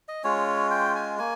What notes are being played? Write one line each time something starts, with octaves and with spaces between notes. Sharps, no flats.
D#5
G#3 C#4 F4 C#5
G5
G#5
A#3 G#5